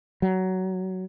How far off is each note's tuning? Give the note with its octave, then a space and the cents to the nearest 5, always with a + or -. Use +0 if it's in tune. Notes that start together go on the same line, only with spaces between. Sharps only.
F#3 +15